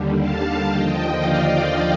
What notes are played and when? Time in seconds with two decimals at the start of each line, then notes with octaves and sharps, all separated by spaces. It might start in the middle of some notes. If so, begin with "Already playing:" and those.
Already playing: D#2 D3 G3
0.18 F5 A5
0.67 D#2 D3 F3 D#5 G5
1.17 D5 F5